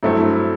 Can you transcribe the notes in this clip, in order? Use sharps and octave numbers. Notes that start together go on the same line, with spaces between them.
G2 F#3 A3 C4 E4